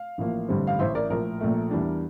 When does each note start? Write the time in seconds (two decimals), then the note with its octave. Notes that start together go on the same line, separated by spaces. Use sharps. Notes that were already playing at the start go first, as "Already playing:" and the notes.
Already playing: F5
0.18 A1 A2 F3 A#3
0.48 A1 G2 D3 G3 C4
0.67 F5
0.79 A1 A2 E3 C5 E5
0.95 A#4 D5
1.10 A#1 A2 F3 A#4
1.40 A#1 A#2 A3
1.71 E2 E3 G3 D4